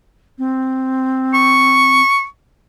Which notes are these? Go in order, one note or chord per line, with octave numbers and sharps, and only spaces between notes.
C4
C#6